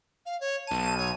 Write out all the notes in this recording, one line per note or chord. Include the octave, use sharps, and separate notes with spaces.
F5
C#5
B1 A5 D#7
C#5